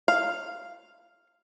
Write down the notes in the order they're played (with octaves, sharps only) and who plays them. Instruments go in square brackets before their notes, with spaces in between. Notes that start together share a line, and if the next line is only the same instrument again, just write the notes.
[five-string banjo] F5